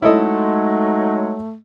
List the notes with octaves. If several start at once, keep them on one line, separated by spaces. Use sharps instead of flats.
F#3 G#3 A3 D#4 E4 A4 D#5